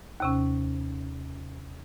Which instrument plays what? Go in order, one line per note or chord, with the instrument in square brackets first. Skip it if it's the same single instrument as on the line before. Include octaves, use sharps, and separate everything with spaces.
[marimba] D#2 C3 C#4